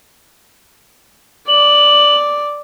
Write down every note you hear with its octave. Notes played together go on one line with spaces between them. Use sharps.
D5 F#7